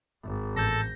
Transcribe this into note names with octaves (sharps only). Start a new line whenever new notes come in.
G#1
A1 A4 G6 A#6